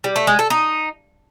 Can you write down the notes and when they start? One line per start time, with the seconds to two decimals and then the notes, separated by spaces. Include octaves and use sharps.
0.04 G3
0.16 A3
0.27 G#3
0.39 A4
0.50 D#4